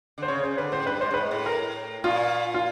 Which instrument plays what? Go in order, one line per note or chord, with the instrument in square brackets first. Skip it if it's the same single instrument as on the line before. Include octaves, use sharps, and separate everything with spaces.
[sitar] D3 [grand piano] C5
[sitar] C#3 [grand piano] C#5
[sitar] C#3 [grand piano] C5
[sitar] D3 [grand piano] B4
[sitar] A2 [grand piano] C5
[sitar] G2 [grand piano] B4
[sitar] G#2 [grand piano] C5
[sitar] G2
[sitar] G#2 [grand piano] B4
[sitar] A2
[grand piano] A#4
[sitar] A#2 [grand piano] F4
[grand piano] F4